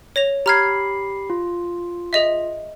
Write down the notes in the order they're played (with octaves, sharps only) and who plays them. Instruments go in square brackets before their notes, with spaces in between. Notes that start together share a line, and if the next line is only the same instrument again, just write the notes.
[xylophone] C#5 A#6 F7
[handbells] G4 B5 C7 [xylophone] A#5 F6 G#6
[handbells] F4
[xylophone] G#4 D#5 E5